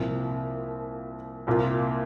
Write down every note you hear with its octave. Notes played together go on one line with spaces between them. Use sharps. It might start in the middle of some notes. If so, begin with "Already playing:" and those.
Already playing: C2 A#2 F3
C2 A#2 A#3 F4